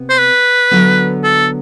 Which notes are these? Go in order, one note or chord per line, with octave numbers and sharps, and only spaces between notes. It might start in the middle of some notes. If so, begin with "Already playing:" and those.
Already playing: C3 B3
C5
B4
D3 F#3 B3
A4